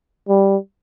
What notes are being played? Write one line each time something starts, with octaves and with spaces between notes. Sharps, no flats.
G3